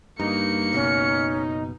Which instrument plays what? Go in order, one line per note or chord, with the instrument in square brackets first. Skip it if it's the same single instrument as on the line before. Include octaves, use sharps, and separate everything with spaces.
[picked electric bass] G2 [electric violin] A#3 C#7 [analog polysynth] D#4
[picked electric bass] F#1 B2 [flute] C#4